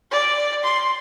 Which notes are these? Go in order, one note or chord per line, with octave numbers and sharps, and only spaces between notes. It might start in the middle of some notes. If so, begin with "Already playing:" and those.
D5
C6